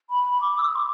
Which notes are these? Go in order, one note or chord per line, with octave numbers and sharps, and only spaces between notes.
B5
D6
E6
D6
C6
D6